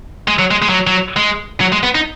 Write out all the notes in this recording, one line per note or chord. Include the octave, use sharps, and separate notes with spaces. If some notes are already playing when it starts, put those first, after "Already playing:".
G#3
F#3
G#3
G#3
F#3
F#3
G#3
F#3
G#3
B3
D#4